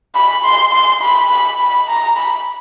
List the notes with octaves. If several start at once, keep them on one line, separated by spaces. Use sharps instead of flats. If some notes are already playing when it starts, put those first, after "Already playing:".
B5
C6
C6
B5
B5
B5
A#5
B5